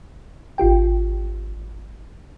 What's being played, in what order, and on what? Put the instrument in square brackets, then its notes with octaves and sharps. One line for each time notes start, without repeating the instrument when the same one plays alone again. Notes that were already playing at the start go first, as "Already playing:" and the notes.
[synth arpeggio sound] G#1 F4 G4 G5